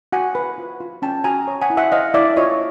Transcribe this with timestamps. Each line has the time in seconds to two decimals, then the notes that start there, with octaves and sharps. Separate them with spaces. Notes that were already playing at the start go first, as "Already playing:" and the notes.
0.12 F#4 F#5 G#5
0.35 B4
0.58 F4
0.80 F4
1.02 C#4 G5 A5
1.24 F#4 G#5 A#5
1.48 C#5
1.62 F#5 G#5
1.70 E4
1.77 E5 F#5
1.92 C5 D#5 F5
2.14 E4 D5 E5
2.36 F4 C#5 D#5